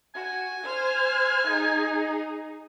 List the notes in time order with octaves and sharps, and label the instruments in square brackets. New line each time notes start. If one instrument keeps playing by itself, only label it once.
[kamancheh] F#4 [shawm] G#5
[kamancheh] C5 F6
D#4 G#4